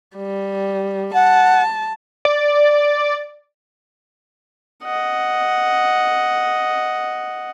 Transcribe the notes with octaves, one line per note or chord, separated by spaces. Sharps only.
G3
F#5 A5
D5
D#5 F#5